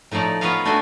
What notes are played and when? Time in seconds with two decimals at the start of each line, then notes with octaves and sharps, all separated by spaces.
0.12 A2 F3 A3 D#4 D5
0.41 B3 F4 B4 C#5 D#5 F5
0.65 A3 D4 F#4 C5 E5 G#5